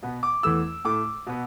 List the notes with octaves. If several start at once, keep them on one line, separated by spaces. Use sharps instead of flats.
B2 B3
D6
E2 E3 A3 E6
A2 A3 D6
B2 B3